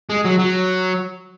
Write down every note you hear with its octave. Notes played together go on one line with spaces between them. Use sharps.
G#3
F#3
F#3